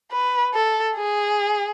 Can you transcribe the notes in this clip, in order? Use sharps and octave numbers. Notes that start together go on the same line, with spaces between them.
B4
A4
G#4